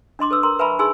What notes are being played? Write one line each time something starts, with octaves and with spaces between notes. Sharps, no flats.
D4 D#5 C6 D6
A4 B4 E6
A#4 A#5 C6
B4 E5 G#5 A#5 B5 C#6
D#4 G#4 G#5 C6 E6